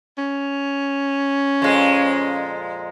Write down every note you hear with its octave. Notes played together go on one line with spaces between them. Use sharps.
C#4
F2 A#2 G#3